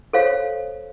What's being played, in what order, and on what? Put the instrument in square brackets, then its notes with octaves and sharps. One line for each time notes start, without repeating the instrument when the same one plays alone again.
[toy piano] A4 C5 C#5 F5